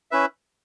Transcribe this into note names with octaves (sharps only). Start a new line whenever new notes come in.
C#4 E4 B4 E5